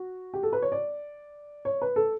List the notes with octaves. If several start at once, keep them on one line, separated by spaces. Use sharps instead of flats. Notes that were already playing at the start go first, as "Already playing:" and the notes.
Already playing: F#4
G4
A4
B4
C#5
D5
C#5
B4
A4